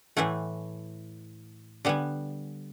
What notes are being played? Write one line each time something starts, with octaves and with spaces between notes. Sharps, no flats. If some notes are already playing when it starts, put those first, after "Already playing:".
A2 E3 A3 F#5 G#5
D3 G3 B3 F#5 G#5